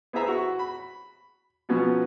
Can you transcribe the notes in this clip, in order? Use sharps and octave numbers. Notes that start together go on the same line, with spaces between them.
B3 E4 G#4 C5 E5 A#5
F#4 C#6
B5
B2 F3 F#3 B3 C#4